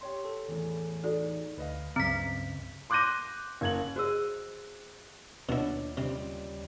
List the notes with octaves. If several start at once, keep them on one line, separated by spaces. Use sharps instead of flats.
G4 C#5 C6
A4
E2 A2
D#4 F#4 A4 D5
D2 B4 D#5 F5
C#2 G2 C#3 F#3 C4 A#5 B6
C6 D6 F#6 G6 A#6 D#7
F#1 G#6 F#7
F#4 G#4 C5 D#5 E6 F#6
D#2 B2 D4 E4 F4 C#5 D#5
C#2 C3 G3 C5